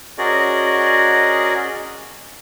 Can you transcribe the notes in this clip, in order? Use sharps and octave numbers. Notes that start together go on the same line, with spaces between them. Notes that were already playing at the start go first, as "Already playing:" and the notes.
C#4 F#4 G#4 A#4 D5 D#5